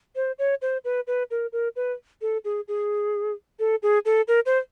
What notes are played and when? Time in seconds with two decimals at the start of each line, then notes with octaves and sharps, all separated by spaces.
0.16 C5
0.39 C#5
0.62 C5
0.84 B4
1.07 B4
1.31 A#4
1.53 A#4
1.76 B4
2.22 A4
2.45 G#4
2.68 G#4
3.59 A4
3.83 G#4
4.05 A4
4.28 A#4
4.46 C5